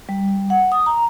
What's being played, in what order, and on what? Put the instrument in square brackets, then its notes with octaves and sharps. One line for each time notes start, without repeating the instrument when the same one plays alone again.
[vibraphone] G3
F#5
D#6
A#5